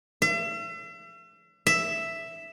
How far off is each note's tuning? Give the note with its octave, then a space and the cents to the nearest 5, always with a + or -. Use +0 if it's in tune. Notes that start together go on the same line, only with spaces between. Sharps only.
E5 +40
E5 +5